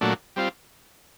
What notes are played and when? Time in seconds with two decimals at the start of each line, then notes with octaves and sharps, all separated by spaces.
0.01 A#2 F#3 A3 D4
0.36 G3 C4 F4